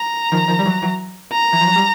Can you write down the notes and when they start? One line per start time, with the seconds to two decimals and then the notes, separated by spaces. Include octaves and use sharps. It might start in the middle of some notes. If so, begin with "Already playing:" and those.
Already playing: A#5
0.32 D#3 F3
0.48 D#3 F3
0.59 G3
0.65 E3 F#3
0.82 E3 F#3
1.32 A#5
1.53 E3
1.61 F3
1.67 F#3
1.76 G3